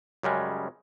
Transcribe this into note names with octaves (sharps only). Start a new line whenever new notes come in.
F#2 C#3 G3 G#3